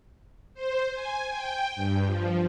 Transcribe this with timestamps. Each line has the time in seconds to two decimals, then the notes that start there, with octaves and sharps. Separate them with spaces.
0.54 C5
0.94 G#5
1.29 G5
1.75 G2
2.05 F3